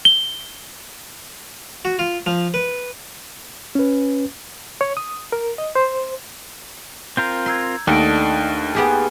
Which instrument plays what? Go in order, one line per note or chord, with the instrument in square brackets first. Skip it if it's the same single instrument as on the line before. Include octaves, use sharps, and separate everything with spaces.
[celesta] G7
[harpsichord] F#4
F4
F3
B4
[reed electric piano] C#4 B4
C#5
D#6
A#4
D#5
C5
[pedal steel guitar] C4 F4 A#4 [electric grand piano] G6
[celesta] A#5 E6 G#6 [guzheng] C6
[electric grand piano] D#2 A3 [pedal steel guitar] D4 D#5 [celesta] D#4 F#5 D7 [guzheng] A4
[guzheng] B3 G4 G#4